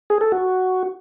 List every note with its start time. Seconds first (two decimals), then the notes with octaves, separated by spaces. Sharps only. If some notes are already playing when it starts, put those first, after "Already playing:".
0.10 G#4
0.21 A4
0.32 F#4